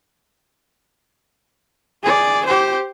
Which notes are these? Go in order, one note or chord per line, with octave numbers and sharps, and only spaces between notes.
G#4 D5
G4 C5